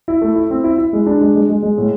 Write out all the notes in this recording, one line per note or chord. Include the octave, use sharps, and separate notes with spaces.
E4
A3
E4
C4
E4
E4
G#3
D4
G#3
G#3
G#3
G#3
A2